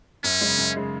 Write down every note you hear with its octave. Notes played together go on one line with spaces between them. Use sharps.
F#2 C#4
C#3 G#3
F#2
C#3 G#3